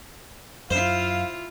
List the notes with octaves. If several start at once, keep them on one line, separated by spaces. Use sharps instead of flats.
F#2 E4 F4 C5 F5